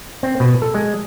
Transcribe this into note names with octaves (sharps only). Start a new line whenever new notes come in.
C4
B2
A4
G#3